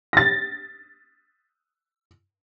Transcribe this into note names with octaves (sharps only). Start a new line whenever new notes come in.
A6 A#6